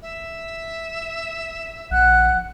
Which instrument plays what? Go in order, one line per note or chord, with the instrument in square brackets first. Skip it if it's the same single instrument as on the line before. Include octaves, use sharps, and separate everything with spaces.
[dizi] E5
[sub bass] A#1 [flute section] F#5 F#6